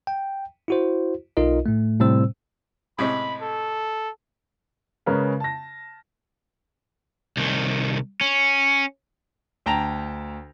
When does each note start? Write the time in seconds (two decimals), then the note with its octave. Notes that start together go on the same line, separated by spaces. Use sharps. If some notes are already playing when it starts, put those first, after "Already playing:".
0.07 G5
0.68 E4 F#4 C5
1.37 B1 D#4 F4 A#4 D#5
1.66 A2 A3
2.00 A2 C3 G3 C4 C5 E6
2.98 A2 C3 G#3 B5
3.41 A4
5.06 C#3 G#3 C#4 A#4 B4
5.40 A5 A#6
7.37 C2 D#3
8.21 C#4
9.66 D2 G5 A5 A#5 A#6 F7